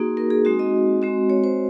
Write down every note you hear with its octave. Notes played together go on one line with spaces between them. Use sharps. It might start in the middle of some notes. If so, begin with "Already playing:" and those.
Already playing: A#3 D#4 F#4 G#4
A#4
G#4
G#3 C4 D#4 F#4
D#5
G#3 C4 F#4
C#5
C5